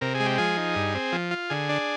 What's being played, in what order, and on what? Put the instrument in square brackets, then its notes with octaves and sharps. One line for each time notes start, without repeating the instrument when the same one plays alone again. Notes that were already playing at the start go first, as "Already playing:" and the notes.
[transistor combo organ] C3 A#4
G#4
G#3
G4
F3 G#4
D#4
G2
C4
F3
F4
D3 G#4
D4